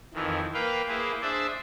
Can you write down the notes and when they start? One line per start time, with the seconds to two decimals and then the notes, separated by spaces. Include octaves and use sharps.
0.14 F2 D#3 E3
0.54 A#3 B4 F5 G5
0.88 A#3 E4 G#4 B4 C5
1.22 D4 G#4 C5 D5 E5